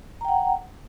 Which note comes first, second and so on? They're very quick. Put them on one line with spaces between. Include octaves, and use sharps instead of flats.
A#5 G5 F#5